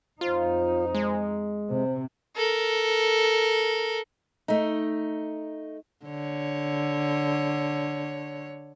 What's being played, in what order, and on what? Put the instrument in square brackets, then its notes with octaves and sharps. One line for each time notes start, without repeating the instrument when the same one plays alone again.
[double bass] F2 D#4 [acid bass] F4 [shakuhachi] C5
[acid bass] G#3
[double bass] C3 [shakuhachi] C5
[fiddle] A4 A#4
[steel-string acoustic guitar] A3 D#4
[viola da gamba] D3 C#5